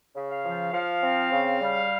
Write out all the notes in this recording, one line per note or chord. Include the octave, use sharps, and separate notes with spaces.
C#3
F5
F3
F3 F5
C4
C#3
G3